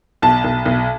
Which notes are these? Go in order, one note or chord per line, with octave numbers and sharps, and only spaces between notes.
B1 A5
B1
B1